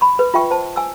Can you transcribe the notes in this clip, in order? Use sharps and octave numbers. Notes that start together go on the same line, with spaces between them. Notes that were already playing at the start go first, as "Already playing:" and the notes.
B5 C#6
B4
F4 E5 G5 C#6
C5 A5
G#5 E6